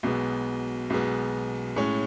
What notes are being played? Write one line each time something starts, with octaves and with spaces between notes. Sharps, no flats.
B1 B2 G#3 B3
B1 B2 G#3 B3
A2 G#3 C#4